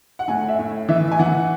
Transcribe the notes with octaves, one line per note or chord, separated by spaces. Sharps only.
F#5
A2 G#5
E5
A2
E3 E5
G#5
E3 F#5